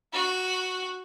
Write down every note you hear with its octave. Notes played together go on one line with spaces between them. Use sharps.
F#4